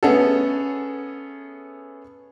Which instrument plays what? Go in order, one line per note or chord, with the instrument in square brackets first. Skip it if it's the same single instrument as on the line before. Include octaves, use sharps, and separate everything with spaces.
[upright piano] A3 B3 C#4 G#4 A4